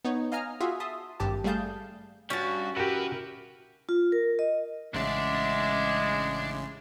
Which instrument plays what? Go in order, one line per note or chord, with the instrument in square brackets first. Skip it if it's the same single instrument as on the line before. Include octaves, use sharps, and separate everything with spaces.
[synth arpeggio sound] B3 D#4 C#5
D#5 F5 G#5 A#5 F6
F4 F#4 G#4 E5 F5
E5 A5 C6 D#6
G#1 G2 G4 A5
G3 A3 G#4 F5 A5 G6
[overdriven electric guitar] G2 [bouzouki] C#4 A5 [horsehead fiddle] F#4
[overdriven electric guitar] E4 B4 [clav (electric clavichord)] F#4 G4 [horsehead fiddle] A#4
[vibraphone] F4
A#4
D#5
[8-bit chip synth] A1 C#3 [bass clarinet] G#3 [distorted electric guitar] D4 D5 [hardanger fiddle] E5 F#5